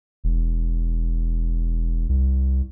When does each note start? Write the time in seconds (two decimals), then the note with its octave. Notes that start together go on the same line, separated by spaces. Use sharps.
0.24 E1
2.09 C2